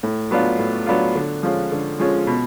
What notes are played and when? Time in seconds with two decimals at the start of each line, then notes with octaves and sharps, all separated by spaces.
0.03 A2
0.31 F#3 B3 D4 F4
0.59 A2
0.86 F#3 B3 D4 F4
1.15 D3
1.43 F3 G#3 C#4 F4
1.72 D3
1.99 F3 G#3 C#4 F4
2.27 B2